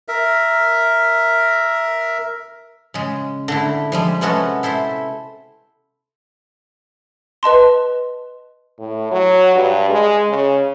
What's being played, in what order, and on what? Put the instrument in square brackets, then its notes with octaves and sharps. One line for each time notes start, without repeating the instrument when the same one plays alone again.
[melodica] A#4 E5
[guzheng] C#3 G#3
D3 A3 E4
F3 G3 G#3
C3 G#3 B3 C#4 F#4 A4
E4 A4 C5 E5
[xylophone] B4 D#5 A5 C6
[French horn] A2
F#3
G2
G#3
C#3